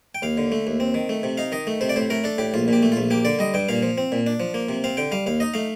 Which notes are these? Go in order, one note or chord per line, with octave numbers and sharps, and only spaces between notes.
G5
D#2 F5
D3
A3
D#2
C4
D#3
A3
C3
D#4 F5
D#3 D#5
A3
C3 C5
D5
A2 C5
A3 A#4
D4 A4
A2 G4
A#1 F4
A#2 G4
A3
F4
A#1
A#3 G4
D3 D5
G3 D#5
G2 G5
A#2 F5
F3
C4
A#2
D4
F3
A#3
C3
C4 F5
D3 G5
G3 F5
D#2 F5
D#4 D#5
A3 F5